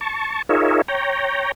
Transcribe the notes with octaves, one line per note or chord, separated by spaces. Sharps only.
A5 C#6
D#4 F4 G#4 A#4 C#5 E5
C#5 G5 A#5